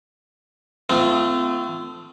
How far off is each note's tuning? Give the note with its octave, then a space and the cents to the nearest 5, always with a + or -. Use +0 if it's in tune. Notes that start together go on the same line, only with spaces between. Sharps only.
A3 +0 C4 -40 F4 -20